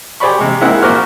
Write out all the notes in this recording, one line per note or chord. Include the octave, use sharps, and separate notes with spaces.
G4 G#4 C5 D5 B5 C#6
C3 G#3
G#3 A#3 C4 E4 G#4 F#5
A#1 F#4 A#4 C5 D6 F6